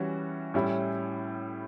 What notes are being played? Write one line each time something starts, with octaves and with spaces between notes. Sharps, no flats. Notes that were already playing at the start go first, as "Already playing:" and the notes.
Already playing: E3 G3 C#4 F#4
A2 G3 C#4 E4